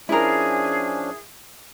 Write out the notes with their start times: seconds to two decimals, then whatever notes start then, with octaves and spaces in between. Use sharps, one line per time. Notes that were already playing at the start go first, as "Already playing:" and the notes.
0.09 F3 C#4 D4 E4 G#4 A#4